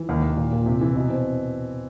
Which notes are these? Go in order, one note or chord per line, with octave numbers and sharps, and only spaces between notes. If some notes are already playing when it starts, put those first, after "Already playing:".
Already playing: E3
D#2
D#2
A#2
A#2
C3
E3
B2
C4